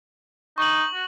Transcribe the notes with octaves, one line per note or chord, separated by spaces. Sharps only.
D#4 C#6 F#7
F#4